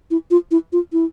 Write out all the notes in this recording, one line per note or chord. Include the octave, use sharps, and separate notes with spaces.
E4
F4
E4
F4
E4